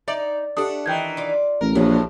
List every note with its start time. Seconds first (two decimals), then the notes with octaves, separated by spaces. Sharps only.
0.08 D#4 D5 E5
0.57 A3 D4 G4 A4 F#5 D#6
0.86 D#3 E3 G5 G6 G#6
1.17 F4 D5
1.61 A1 A#4
1.75 A#1 E2 A2 G4 B4 C#5